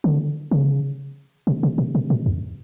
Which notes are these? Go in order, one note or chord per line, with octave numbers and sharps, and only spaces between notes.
D3
C#3
C3
C3
B2
B2
A#2
E2